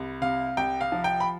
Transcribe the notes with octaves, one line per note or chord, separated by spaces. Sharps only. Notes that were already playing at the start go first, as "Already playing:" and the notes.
Already playing: C2
C3 F5
C2 G5
F5
F3
G5
B5